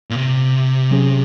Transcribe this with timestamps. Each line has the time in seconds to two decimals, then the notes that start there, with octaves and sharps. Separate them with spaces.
0.10 A#2
0.15 C3
0.91 F#3 C#4 G#4